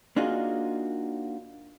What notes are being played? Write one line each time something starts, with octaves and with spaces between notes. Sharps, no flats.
A#3 D4 D#4 F4 F#4 G#4